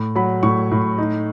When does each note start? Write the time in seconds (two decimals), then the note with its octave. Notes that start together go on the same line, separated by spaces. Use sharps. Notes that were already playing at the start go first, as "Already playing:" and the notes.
Already playing: A2
0.15 F#3 B5
0.43 A2 C#6
0.71 A2
0.98 D#4